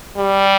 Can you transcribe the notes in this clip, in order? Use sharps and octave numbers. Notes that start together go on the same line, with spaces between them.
G3